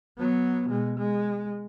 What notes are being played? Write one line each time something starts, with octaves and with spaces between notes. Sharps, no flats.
F#3 B3
B2 G#3
G#3